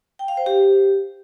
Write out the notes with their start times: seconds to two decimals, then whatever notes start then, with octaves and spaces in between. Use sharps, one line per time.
0.19 G5
0.28 F5
0.37 C5
0.46 G4